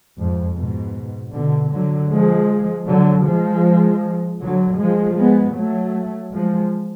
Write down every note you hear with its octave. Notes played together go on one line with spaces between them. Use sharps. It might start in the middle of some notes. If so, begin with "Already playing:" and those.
F2 G#2
G#2 B2
B2 D3
D3 F#3
F3 G#3
D3 F#3
F3 G#3
D3 F#3
F3 G#3
G#3 B3
F#3 A3
F3 G#3